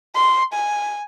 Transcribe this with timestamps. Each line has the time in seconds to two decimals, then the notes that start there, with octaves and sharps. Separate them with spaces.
0.15 C6
0.54 G#5